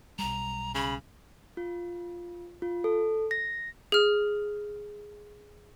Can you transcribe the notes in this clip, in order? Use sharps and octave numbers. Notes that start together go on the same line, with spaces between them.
B1 G3 A#5
C#3 B5
F4
F4
A4
A#6
G#4 F6